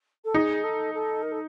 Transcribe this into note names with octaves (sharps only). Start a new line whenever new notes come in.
A4
D#4 G#4
A4
A4
A#4
A4